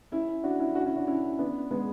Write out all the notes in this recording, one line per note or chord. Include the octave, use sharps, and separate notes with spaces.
C#4 E4
D4 F#4
C#4 E4
D4 F#4
C#4 E4
D4 F#4
C#4 E4
B3 D4
G#3 B3